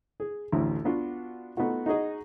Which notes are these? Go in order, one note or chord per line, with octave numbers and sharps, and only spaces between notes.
G#4
A1 D2 D4
B3 D4 F4 F#4
A3 B3 D#4 F4 F#4
D#4 F#4 G#4 D#5